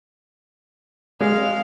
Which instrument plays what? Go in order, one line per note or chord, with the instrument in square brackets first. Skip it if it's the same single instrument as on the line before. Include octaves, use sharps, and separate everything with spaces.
[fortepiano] G#3 [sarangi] F5